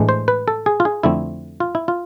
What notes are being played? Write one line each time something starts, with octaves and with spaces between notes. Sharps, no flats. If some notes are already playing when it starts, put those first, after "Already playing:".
Already playing: A2 E3 G#3 D4
C5
B4
A4
G#4
F4
G#4
F2 D3 A3 C4 E4
F4
E4
F4